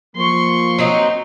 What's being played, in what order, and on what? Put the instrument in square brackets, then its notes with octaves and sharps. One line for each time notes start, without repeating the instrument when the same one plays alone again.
[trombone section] F3 A#3 [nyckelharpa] C6 C#6
[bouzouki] F#3 C4 D#4